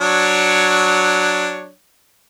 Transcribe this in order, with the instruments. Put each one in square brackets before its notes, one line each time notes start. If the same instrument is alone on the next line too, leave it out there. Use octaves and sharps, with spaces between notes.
[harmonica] F#3 D4 C#5